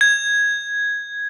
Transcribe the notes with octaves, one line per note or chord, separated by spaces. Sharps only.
G#6